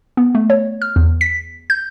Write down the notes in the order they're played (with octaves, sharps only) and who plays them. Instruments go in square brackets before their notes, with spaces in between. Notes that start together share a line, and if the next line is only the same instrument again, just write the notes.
[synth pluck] B3
A3
C#5
F6
E2
B6
G6